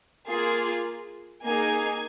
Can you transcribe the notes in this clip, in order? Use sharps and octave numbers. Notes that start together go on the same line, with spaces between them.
A#3 F4 G#4
A#3 D#4 G#4 G#5